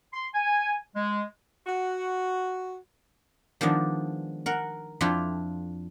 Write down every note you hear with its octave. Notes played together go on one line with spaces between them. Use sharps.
C6
G#5
G#3
F#4
D#3 F3 G#3 B3 D4
A#4 F#5
F2 D4 E4 F4 A4 G5